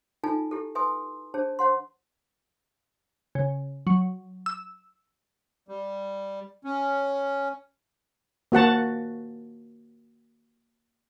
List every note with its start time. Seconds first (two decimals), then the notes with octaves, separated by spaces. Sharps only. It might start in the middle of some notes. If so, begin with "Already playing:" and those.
0.24 D#4 F4 A4 G#5 A5
0.51 E4 G4 A4
0.75 B4 E5 G#5 C6 D#6
1.34 D4 G#4 C5 A5
1.59 C5 F#5 C6
3.35 C#3
3.87 F#3
4.46 E6
5.68 G3
6.64 C#4
8.52 A#3 F#4 F#5 A5